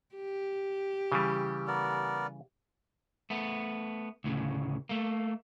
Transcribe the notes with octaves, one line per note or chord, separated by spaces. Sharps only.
G4
C#3 E3 G3
B3 A#4 D5
A3 B3
D2 A2 C#3
A3 A#3